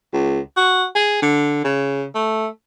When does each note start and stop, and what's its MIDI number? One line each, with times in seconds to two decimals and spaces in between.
0.13 0.40 37
0.57 0.85 66
0.95 1.21 68
1.22 1.60 50
1.64 2.06 49
2.15 2.47 57